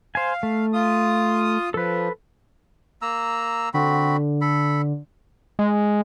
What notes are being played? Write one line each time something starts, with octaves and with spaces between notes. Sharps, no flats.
C5 F5 G#5
A3
F4 D#6
F3 A4 B4
A#3 A#5 E6
D3 C4 F#4 B5
A4 B5
G#3